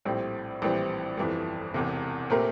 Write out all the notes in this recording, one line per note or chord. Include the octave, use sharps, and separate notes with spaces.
A#1 A2 G3 C4
A#1 A2 E3 G3 C4
G1 F2 E3 G3
E1 E2 C3
A#2 A3 C4 G4 A#4